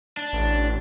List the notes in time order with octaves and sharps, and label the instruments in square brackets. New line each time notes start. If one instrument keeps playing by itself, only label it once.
[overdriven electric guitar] D4
[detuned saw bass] A1